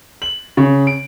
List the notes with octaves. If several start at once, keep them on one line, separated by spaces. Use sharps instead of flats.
F#7
C#3
D7